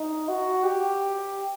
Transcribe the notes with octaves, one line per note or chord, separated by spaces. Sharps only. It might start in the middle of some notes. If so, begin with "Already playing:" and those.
Already playing: D#4
F#4
G4